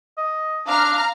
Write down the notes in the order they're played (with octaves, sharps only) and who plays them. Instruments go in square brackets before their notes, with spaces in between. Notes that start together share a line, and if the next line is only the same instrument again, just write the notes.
[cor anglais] D#5
[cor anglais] D4 [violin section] F5 A#5 F6